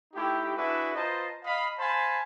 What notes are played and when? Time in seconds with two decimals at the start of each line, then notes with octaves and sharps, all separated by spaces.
0.14 A3 D#4 E4 G4
0.56 D4 E4 F#4 G#4 B4 E5
0.95 F4 B4 C5 D#5 A5 A#5
1.45 D#5 F5 B5
1.79 C5 F5 G#5 A5 B5 C6